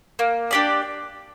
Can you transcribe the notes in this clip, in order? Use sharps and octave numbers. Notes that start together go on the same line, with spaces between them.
A#3
D4 G4 D5